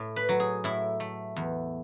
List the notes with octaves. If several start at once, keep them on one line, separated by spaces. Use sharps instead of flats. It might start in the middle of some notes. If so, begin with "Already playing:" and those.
Already playing: A2
B4
F#3
G#4
A2 E4
A3
E2